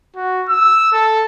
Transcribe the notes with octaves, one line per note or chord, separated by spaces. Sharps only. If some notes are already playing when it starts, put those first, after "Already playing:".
F#4
E6
A4